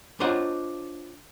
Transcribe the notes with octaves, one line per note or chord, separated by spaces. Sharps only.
D4 F4 C5 C#5 D#5 F#5